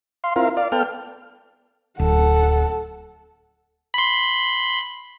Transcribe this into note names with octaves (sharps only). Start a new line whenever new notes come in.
F5 C6
C4 E4 F4 A#4 F5
D5 F5
B3 A4 G5 F6
D1 A4 F#5
B5 C6